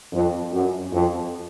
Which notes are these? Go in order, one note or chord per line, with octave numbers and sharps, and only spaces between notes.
F2
F#2
F2